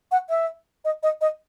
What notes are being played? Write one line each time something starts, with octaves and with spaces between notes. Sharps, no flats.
F#5
E5
D#5
D#5
D#5